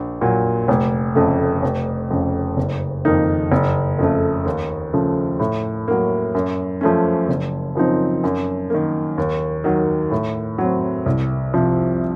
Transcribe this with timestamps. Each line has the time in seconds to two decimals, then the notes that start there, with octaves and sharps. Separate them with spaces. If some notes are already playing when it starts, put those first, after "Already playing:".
Already playing: A#1
0.21 A#2 F#3
0.68 F1
1.15 F2 C#3 A3
1.62 F1
2.10 F2 C#3
2.57 F#1
3.05 F2 D#3 A#3 D#4
3.52 F#1
3.99 F2 C#3 A3
4.45 D#2
4.93 C#3 F3 A3
5.39 A2
5.88 F#3 A#3
6.35 F#2
6.81 F3 A3 C#4
7.29 F#1
7.75 F#2 F3 C4 D#4
8.24 F#2
8.70 D#3 A#3
9.18 D#2
9.64 D#3 F#3
10.11 A2
10.58 F#3 C4
11.06 C2
11.54 C3 F3